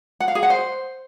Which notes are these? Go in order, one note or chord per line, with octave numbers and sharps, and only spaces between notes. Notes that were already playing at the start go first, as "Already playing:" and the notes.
F#5
F5
G#4
F#5
C5